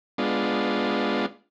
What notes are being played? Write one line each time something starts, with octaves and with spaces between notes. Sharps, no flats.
G#3 B3 D4 F4